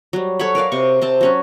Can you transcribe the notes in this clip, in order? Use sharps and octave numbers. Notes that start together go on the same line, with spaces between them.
F#3 G3
A4 C#5 F#5 B5
A#4 B4 D5 F5
C3 C#6
C3 C4 A5
F#3 C#4 F#4